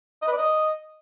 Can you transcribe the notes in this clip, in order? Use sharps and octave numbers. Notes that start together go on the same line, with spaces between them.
D#5
B4
D5
D#5